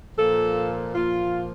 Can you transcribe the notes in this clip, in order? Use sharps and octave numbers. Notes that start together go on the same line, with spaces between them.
A#2 F3 A#3 A4
A#2 F3 A#3 F4